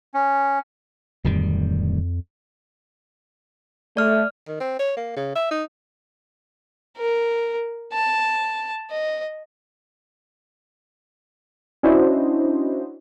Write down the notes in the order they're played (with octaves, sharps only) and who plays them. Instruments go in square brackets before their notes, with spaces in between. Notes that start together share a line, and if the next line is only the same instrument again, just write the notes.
[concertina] C#4
[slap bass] D1 D#3 G3 [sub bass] F2
[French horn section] A3 [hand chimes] D5 F6
[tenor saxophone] D#3
C4
C#5
A#3
C#3
E5
D#4
[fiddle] A#4
A5
D#5
[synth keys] C#4 D4 E4 F#4 C5 D#5